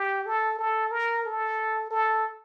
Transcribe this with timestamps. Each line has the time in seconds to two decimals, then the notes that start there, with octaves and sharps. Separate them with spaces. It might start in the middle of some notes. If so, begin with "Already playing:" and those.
Already playing: G4
0.26 A4
0.59 A4
0.91 A#4
1.25 A4
1.90 A4